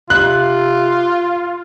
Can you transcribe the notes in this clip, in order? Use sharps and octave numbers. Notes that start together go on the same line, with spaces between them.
C3 F4 F#6